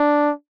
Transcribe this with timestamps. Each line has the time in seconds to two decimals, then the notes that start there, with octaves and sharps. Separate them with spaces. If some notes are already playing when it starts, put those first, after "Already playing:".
Already playing: D4